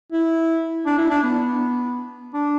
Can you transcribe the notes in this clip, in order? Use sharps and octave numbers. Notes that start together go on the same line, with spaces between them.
E4
D4
E4
D4
B3
D4